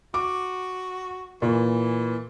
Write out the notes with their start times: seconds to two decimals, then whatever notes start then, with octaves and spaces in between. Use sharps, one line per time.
0.14 F#4 D6
1.42 A#2 E3